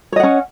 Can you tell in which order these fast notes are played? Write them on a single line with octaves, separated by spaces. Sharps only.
C#5 D#5 F#5 C#4